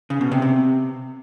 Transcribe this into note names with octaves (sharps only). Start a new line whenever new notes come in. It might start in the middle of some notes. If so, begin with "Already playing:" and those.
C#3
B2
C3
C3